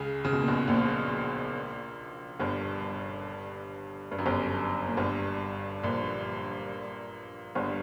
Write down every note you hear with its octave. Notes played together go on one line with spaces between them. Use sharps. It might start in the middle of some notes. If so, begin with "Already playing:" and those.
Already playing: C#2 C#3
C#3
B2
A#2
B1 B2
A#1 A#2
G1 G2
G2
F#2
G1 G2
A#2
G1 G2
A#1 A#2
G1 G2